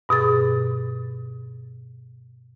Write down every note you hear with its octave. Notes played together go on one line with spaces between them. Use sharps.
G2 B2 G#4 A6